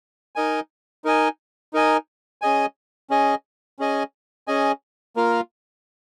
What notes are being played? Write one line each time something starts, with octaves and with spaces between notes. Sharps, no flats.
D#4 A#4 D#5 G#5
D#4 A#4 D#5 G#5
D#4 A#4 D#5 G#5
C#4 G#4 D#5 G#5
C#4 G#4 D#5 G#5
C#4 G#4 D#5 G#5
C#4 G#4 D#5 G#5
A#3 F4 A#4 F5